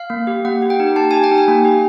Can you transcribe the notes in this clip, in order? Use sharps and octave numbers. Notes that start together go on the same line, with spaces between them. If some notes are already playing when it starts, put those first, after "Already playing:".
Already playing: F5
A#3
G4
A#3 F#5
G4
G5
D#4
G4 A5
G4 G#5
G5
D#4
G#5
A#3
G4